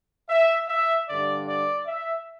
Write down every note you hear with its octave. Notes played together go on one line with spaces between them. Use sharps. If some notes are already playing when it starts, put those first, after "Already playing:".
E5
E5
G2 D3 D5
D5
E5